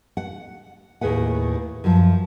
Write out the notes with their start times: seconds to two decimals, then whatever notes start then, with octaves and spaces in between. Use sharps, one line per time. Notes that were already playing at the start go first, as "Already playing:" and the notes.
0.17 F#5
1.01 D#2 A2 G#4 B4 F#5
1.84 F#2 F3